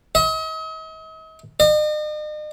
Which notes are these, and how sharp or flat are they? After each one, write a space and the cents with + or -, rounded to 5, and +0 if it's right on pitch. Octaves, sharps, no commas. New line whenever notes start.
D#5 +45
D#5 -40